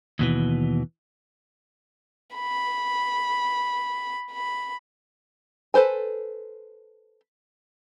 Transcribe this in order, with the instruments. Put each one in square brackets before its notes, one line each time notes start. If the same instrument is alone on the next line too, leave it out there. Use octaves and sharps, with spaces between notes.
[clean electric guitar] D#2 B2 E3
[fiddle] B5
B5
[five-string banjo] A4 B4 C5 G#5